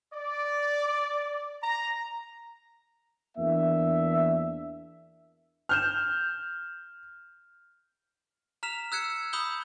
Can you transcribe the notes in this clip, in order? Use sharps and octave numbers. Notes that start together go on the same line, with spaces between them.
D5
A#5
E2 A#3 D4 E5
F6 G6 E7
A#5 F6 B6 E7 F7
E6 F#6 G#6 C#7 E7
B5 D#6 E6 F#6 G6 G7